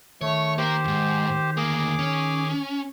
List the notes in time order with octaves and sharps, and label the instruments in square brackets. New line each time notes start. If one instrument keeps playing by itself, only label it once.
[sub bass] D#3 [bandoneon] A3 [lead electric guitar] C#5
[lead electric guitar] A#3 A#4 [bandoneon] G4 C5
[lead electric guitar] D#2 G#2
[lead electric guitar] D2 A#3 [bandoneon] G#4 D6
[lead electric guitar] C#4